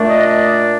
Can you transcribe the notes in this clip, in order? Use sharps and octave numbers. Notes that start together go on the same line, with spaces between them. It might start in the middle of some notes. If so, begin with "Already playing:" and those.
Already playing: A#2 A3 D4
D#5
D#5